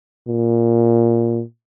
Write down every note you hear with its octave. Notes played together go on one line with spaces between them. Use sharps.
A#2